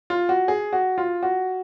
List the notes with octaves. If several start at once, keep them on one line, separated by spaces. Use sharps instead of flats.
F4
F#4
G#4
F#4
F4
F#4